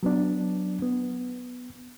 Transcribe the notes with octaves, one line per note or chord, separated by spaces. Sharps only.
F#3 B3 D4
B3